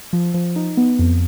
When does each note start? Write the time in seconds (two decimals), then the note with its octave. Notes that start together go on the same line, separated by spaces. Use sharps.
0.13 F3
0.34 F3
0.56 D#4
0.77 B3
0.99 F2